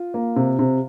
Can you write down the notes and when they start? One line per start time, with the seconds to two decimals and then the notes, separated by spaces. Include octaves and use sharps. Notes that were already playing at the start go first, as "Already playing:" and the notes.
Already playing: F4
0.14 A#3
0.36 C3
0.59 C3